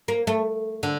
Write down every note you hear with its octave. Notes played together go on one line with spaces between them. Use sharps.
A#3
A3
D3